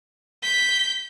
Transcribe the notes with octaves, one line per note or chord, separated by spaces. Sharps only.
G6 B6